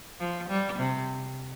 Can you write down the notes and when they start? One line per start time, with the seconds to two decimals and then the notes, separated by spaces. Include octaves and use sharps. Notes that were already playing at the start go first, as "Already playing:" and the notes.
0.20 F3
0.49 G3
0.78 C3